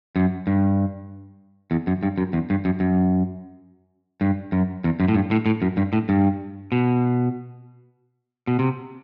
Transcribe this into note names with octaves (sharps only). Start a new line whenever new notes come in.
F#2
G2
E2
F#2
G2
F#2
E2
G2
F#2
F#2
G2
F#2
E2
F#2
A2
G2
A2
A2
F#2
G2
A2
G2
B2
B2
C3